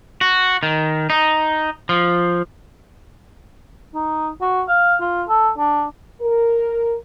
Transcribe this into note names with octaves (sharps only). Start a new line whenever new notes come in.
F#4
D#3
D#4
F3
D#4
F#4
F5
F4
A4
D4
A#4